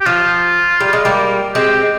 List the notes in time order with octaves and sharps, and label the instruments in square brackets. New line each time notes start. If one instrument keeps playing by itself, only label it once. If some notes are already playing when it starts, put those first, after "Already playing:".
[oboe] G4
[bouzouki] F3 [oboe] F4
[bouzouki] G3
G#3
G3 A#3
[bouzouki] G#3 C4 [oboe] G4